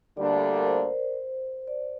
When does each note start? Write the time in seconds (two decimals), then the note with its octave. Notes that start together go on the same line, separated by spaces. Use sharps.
0.17 D2 D3 G3 A#3 D4 D5
0.42 A#4
0.67 C5
1.68 D5